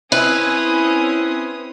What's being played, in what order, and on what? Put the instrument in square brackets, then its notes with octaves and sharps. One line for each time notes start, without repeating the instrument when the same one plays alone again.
[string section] C4 C#4 D#6 [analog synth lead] E4 [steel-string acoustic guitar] B4